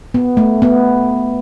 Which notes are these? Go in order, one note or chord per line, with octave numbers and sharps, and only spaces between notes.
B3
A3
B3